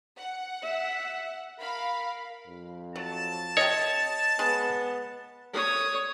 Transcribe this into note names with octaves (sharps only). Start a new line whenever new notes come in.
F#5
E5
A#4 F5 B5
F2
F#3 A5
C3 C#5 D#5
G#3 B3
C#5 D#6